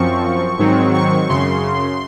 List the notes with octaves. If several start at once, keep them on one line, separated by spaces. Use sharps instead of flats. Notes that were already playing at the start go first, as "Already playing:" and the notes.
Already playing: F#2 F3 C4 C#6
G#2 D#3 F#3 C4
C#6
F#2 C#3 C6